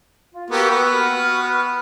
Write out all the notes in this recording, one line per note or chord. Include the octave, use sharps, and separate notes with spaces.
F4
A#3 B3 F#4 G4 G5 E6
B3 B4
F#4 F6